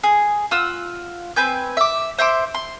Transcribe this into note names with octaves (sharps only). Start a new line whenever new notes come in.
G#4
F4 F#5 E6
C4 B4 G#5 G6
E5 D6
C5 E5 C6 D6
C6